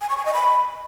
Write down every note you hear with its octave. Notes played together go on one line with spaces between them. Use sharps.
G#5
C#6
G#5
D#5
B5